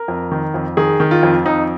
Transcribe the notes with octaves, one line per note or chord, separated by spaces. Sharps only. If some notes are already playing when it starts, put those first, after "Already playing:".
Already playing: A#4
F2
D#3
F2
D#3 G#4
D#3
F4
F2
F2 D#4